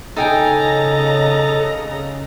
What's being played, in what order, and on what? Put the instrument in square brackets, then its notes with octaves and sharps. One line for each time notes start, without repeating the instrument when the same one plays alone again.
[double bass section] C#3 [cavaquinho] D#4 G5 G#5 [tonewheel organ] A4 [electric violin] D#5 A#5